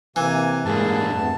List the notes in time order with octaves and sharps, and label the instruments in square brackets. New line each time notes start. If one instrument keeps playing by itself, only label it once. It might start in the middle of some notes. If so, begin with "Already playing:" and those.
[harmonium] C3 [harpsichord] E3 [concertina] A#3 G#5
[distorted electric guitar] G#2 G3 [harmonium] A#3 G#4 [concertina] A5
[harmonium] F2 A3 B3